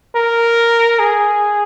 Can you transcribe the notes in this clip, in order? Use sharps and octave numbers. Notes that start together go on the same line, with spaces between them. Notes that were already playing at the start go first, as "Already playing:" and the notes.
A#4
G#4